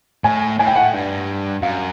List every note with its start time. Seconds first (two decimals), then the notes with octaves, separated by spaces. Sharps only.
0.24 A2 G#5
0.59 A2 G#5
0.67 G5
0.76 F#5
0.93 G2
1.62 F#2 F5